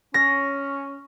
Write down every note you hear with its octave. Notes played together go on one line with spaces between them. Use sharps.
C#4 A#6